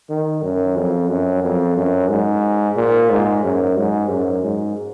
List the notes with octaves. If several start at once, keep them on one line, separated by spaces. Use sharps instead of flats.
D#3
F#2
F2
F#2
F2
F#2
G#2
A#2
G#2
F#2
G#2
F#2
G#2